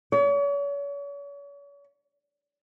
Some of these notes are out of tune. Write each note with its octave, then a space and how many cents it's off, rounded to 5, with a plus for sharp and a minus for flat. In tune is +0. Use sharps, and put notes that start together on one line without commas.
C#5 +40